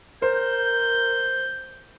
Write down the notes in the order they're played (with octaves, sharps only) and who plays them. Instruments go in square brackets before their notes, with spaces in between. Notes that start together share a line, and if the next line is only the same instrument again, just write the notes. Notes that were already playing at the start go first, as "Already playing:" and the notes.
[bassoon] A#4 [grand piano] C5 [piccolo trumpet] G6